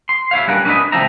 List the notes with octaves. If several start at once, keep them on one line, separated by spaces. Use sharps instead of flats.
C6
E4 C#5 F5
G3 C#4 D4 A#4 B4 F#5
C#4 D4 E4 F#4 B4 D#5
C#2 F3 C4 D4 E5 A#5